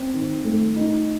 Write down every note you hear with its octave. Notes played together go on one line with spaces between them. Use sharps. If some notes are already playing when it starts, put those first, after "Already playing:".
Already playing: C4
D#3
A3
D#4